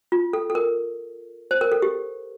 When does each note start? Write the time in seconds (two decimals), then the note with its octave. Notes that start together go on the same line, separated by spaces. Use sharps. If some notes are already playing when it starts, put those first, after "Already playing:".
0.12 F4
0.33 A4
0.50 A4
0.55 A#4
1.51 C5
1.61 A#4
1.72 A4
1.82 G4